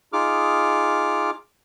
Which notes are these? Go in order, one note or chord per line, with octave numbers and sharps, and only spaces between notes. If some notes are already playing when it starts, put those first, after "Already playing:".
D#4 F4 G#4 D6 F6